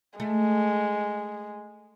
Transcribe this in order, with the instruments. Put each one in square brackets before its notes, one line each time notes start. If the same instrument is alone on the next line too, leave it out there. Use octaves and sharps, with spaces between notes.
[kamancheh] G#3 [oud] A3